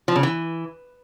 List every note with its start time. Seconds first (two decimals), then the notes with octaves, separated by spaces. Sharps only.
0.08 F3
0.16 C#3
0.23 E3